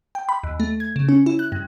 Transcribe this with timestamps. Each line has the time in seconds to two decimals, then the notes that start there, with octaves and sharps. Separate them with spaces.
0.15 G5
0.29 B5
0.44 D#2
0.60 A3
0.80 G#6
0.96 C#3
1.09 C#4
1.26 E4
1.39 F#6
1.52 G2